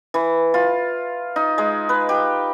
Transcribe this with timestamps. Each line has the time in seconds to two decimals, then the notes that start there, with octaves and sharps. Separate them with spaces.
0.14 E3
0.54 F4
1.36 D#4
1.58 G#3
1.89 B4
2.09 G4